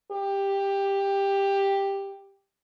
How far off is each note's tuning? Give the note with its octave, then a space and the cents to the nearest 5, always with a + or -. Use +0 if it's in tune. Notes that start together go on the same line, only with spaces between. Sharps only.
G4 +10